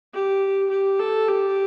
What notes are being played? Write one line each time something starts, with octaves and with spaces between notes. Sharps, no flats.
G4
G4
A4
G4